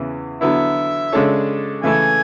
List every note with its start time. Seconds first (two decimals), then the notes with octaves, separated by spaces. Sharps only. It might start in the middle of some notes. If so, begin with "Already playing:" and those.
Already playing: E2 C#3 E3
0.41 D3 F#3 B3 E4 E5
1.12 C#3 G#3 D4 A4 C#5
1.83 C#3 E3 A3 E4 A4 G#5